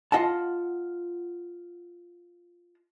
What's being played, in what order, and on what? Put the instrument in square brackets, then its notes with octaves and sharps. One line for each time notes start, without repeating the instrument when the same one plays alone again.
[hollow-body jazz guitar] F4 D#5 F#5 A5